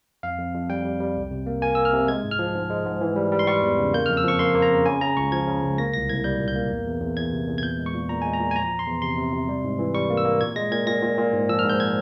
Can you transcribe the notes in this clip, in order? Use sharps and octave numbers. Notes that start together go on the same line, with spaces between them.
F2 F5
F2
F2
G3 G5
G3
G3
C2
C3
A#3
A#3 G#5
A#3 E6
F6
C3
G#3 G#6
G#2
F6
F3
G#2
G#3
G#2
E3
G3
G3
C6
G3 C#6
E2
C#3
A#3 G6
F2 F6
E6
F3 C#6
A#3 C6
A#3
A#5
C#3
C#3 G#5
C#3 A#5
C#2 C#6
F3 G#6
C#3
C#2
A#3 A#6
C2 A#6
C2 G#6
G3 G6
A#2
G6
A#3
E2
E2
E2
E2 G#6
C3
E2
G#6
A#2 G6
G#3
C#6
A#2
A#2 A#5
G#3 G#5
A#5
A#2
G#5
F3 A#5
E2
C6
E2
C3 C6
C3
C3
G3
G#2
E3
G3 C#6
A#3
E6
A#3
A#2 G#6
G#3 A#6
A#2 G#6
A#2 A#6
A#2
A#2
G#2
F3 E6
F6
G#2
G6
G#6